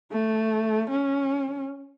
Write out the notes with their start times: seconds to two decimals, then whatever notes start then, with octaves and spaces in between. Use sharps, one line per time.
0.12 A3
0.90 C#4